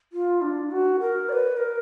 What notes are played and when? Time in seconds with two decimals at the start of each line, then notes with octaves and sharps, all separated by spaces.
0.13 F4
0.42 D4
0.71 F#4
1.00 A#4
1.29 D5
1.33 B4
1.57 A#4